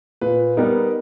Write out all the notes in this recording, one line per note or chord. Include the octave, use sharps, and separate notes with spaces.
A#2 B4
G3 B3 D#4 A#4